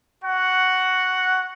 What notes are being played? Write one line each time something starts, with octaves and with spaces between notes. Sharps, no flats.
F#4 F#5